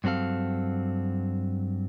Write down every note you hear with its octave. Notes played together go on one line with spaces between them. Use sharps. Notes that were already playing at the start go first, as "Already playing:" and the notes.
G2 F#3 C4 A4 F5